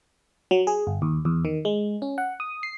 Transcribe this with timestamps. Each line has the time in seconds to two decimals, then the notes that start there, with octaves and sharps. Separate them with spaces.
0.51 F#3
0.67 G#4
0.87 G1
1.02 D#2
1.25 E2
1.45 D#3
1.65 G#3
2.02 C#4
2.18 F#5
2.40 D#6
2.63 C7